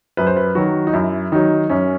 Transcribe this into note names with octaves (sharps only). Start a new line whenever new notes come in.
F#2 B4
C5
B4
D#3 F#3 F#4
D#4
F#2 E4
D#3 F#3 D#4
F#2 C#4